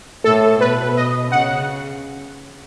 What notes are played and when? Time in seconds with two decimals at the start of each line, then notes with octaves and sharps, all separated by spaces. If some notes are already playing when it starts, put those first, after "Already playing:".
0.24 A2 A4
0.61 B2 B4
0.97 D#5
1.32 C#3 F#5